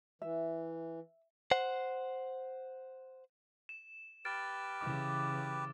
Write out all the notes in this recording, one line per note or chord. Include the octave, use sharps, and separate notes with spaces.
E3 E5
C5 F#5
E7
G4 B4 F6 A6 D7
C#3 E3 D6